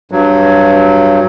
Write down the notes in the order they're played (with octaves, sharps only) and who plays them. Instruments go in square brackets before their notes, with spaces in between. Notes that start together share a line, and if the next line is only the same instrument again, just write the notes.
[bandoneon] G2 F#3